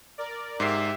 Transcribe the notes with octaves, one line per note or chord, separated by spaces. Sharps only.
A#4 D5
G#2 G4 E5 C7